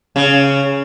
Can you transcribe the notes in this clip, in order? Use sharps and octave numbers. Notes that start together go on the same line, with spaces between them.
C#3